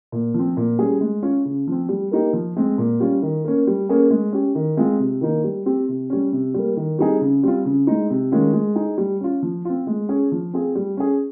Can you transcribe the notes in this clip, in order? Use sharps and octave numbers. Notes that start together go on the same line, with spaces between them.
A#2
F3 C4
A#2
G3 C#4 G#4
G#3
C#4 F4
C#3
F3 C4
G3
A#3 D#4 G4
F3
G#3 C4
A#2
G3 C#4 F4
D#3
A#3 C#4
G3
A#3 C#4 G#4
G#3
C#4 G4
D#3
G#3 C4 F4 G#4
C3
D#3 A#3 D#4
G3
C4 G4
C3
G3 C#4
C3
G3 A#3
D#3
G3 C4 D#4 G#4
C#3
G3 C4 F4
C#3
G#3 D#4
C3
D#3 G#3 C#4 F4
G#3
D#4 G#4
G3
C#4 F4
F3
C4 F4
G#3
C#4 G#4
F3
C4 F4 G#4
G3
C#4 G#4